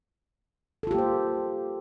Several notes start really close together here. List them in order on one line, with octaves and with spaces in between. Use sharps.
A4 F4 G4 A#3 C5